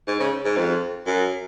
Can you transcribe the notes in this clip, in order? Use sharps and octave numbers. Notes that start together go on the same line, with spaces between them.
G#2
C#3
G#2
F2
F#2